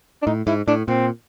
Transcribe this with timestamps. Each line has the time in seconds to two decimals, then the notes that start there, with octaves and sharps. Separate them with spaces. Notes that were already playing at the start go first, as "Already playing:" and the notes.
0.22 D4
0.26 A2 D#4
0.47 G#2 E4
0.68 A2 D4
0.88 A#2 C4